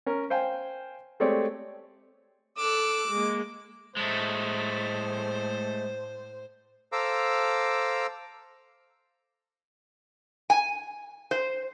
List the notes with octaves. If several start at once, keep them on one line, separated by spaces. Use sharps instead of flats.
C#4 A#4
C5 F5 G5 G#5
G#3 A3 C4 G4 C#5 D5
A4 D6 E6 F#6
G#3 A#3
A2 G#3 A3 C5
A4 C5 F5 A#5 D6 E6
G#5
C5